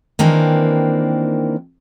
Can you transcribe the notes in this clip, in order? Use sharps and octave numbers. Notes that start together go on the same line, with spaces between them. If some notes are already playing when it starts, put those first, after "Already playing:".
D#3 E3 A#3 C4 D4